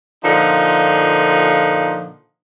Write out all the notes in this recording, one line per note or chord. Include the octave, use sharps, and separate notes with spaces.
A#2 D3 F3 D#4